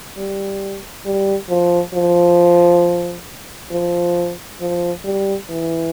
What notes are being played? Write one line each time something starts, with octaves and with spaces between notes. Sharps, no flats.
G3
G3
F3
F3
F3
F3
G3
E3